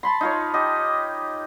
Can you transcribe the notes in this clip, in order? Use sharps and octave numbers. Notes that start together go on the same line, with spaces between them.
A5 B5 C6
D#4 F4 C#5
G4 D#5